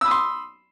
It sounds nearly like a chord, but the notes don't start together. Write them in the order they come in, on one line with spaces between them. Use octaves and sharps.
E6 B5 D#6 C6